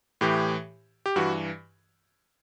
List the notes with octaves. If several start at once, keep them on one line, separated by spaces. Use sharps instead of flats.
A2 E3 G4
G4
G2 E3 F#4